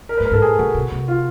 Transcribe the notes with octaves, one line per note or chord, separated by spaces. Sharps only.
A#4
B4
A2
A#4
G#2 A4
A2 G#4
A#2 F#4
B2
C3
F4